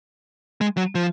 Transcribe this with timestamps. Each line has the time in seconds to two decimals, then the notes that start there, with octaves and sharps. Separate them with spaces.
0.61 G#3
0.77 F#3
0.95 F3